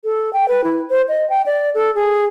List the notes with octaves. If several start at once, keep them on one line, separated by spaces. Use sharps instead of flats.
A4
G5
B4
E4
C5
D#5
G5
D5
A4
G#4